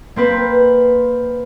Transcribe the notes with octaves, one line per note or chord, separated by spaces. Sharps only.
A#3 C4 B4